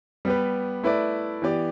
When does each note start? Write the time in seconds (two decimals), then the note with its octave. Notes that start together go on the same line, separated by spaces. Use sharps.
0.25 G3 B3 G4 B4
0.83 A3 E4 B4 D5
1.42 E3 B3 G4 D5